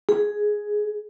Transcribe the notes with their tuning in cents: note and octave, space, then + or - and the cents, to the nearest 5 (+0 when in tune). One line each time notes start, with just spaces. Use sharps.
G#4 +5